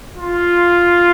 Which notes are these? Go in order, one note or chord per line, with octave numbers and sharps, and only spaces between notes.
F4